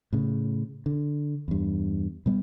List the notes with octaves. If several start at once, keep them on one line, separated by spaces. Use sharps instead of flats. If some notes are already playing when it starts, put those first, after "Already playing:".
A2 C#3
D3
E2 G2
B2 G3 B3